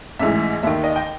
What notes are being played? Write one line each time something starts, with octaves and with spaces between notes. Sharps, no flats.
A1 G#2 E3 E5
D#2 D#3 E5
D#5
G5